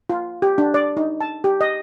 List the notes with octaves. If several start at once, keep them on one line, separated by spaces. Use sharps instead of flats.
F4
G4
D4
D5
D#4
A5
G4
D#5